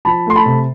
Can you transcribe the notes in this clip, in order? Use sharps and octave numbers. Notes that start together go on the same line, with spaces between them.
F3 A5 B5
A3 C6
A5 B5
C3